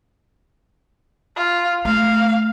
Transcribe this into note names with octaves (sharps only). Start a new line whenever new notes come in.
F4
A3 F5